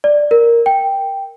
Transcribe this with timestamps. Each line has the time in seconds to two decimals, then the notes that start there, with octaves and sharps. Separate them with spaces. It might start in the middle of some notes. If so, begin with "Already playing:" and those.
0.04 D5
0.31 A#4
0.66 G5